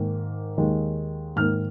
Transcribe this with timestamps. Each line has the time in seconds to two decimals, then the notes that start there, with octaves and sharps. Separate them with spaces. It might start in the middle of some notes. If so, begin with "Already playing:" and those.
Already playing: G#2 D#3 A#3
0.58 D#2 D#3 G#3
1.36 G#2 D#3 A#3 F6